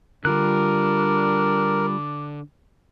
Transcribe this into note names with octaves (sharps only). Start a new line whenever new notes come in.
D3 G3 D4 F4 A#4 F#6